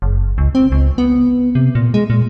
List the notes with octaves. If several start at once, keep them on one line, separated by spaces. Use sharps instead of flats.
F#1
C#2
C4
C#2
B3
C3
A#2
G#3
A#2